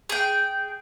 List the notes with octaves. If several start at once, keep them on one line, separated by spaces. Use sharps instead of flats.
G#4 G5